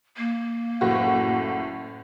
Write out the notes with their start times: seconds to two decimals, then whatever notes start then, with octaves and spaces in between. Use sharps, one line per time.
0.17 A#3
0.81 F#1 A2 F#4